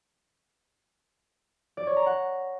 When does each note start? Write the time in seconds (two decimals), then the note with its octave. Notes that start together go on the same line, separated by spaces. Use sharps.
1.77 D5
1.87 C#5
1.97 A#5
2.06 F#5